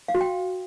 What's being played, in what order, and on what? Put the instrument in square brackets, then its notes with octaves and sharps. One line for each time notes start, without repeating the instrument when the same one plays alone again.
[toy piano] F5
F#4
G5